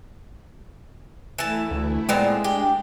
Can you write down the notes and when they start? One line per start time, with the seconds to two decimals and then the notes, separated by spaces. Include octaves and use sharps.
1.38 E3 A3 E4 A5
1.71 D2
2.09 A#2 G#3 B3 C4
2.44 D4 G4